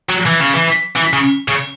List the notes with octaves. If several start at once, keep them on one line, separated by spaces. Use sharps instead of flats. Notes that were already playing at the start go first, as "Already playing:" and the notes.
F#3
E3
C#3
E3
E3
C#3
C#3